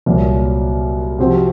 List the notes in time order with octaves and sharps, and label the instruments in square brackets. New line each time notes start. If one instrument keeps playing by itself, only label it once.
[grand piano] C2 A#2 F#3
C3 F3 C4 F#4 C5